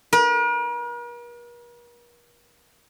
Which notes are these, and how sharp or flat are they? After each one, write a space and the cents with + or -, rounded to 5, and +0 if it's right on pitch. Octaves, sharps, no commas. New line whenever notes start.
A#4 +45